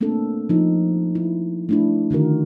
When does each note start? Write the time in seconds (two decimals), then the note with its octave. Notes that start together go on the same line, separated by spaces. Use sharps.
0.01 A3 A#3 C4 D4 A4
0.49 F3 D#4
1.15 E4
1.69 A3 D4 E4
2.11 D3 D#3 F#4 A#4